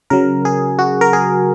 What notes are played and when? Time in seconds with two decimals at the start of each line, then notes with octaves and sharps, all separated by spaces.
0.10 C#3 F#3 A#4
0.45 G#4
0.79 F#4
1.01 A#4
1.13 G#4